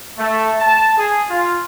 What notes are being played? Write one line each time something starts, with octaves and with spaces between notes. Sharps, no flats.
A3
A5
G#4
F4